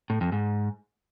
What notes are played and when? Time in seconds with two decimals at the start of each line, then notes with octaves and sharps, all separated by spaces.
0.10 A2
0.21 F2
0.32 G#2